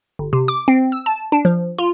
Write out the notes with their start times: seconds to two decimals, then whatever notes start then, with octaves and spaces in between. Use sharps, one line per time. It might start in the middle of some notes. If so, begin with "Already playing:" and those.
0.19 G1
0.33 C3
0.48 D6
0.68 C4
0.92 E6
1.06 A5
1.32 D4
1.45 F3
1.79 F4